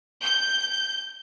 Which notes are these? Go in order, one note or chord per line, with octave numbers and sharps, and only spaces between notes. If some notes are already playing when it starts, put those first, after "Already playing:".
G6